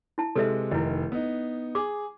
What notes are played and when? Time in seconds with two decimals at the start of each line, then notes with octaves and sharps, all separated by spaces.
0.18 E4 A5
0.36 C3 G#3 A4 B4 E5
0.71 F1 D#3 E4 D#5
1.12 B3 D#4
1.75 G#4 D6